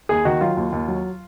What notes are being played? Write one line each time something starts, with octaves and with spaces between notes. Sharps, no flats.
D#2 G#4
D#3 F#4
F#3 F4
D#2
D#2
F#3